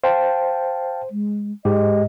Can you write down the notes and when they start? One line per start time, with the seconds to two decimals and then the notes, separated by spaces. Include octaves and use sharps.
0.04 C5 F5 G5 A5
1.11 G#3
1.65 G#2 G#3 G4 D#5